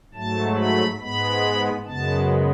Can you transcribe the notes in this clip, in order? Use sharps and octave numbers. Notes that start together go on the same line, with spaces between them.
G#2 F#3 A3 A5
B5
G#2 G#3 B3 B5
F#2 C#3 G#3 B3 A5